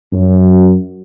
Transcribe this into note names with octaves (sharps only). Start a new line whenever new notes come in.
F#2